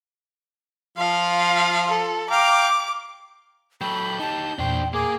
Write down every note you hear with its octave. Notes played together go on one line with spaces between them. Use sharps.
F3 F4 F5
A4
F5 G5 A#5 D6
F#3 A4 G5 B5 G6
D#4 G4 A5
E2 A#2 D4 C5 G5
A#3 G#4 D6